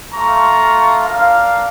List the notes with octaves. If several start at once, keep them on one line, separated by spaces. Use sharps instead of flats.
A3 F4 F5 A#5 C#6
D4 A#4 F5